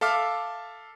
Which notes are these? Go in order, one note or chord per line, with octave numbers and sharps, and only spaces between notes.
A4 E5 F5 D6 F6